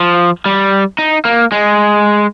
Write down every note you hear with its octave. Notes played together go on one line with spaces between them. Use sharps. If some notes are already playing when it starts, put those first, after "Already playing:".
Already playing: F3
G3
D#4
A#3
G#3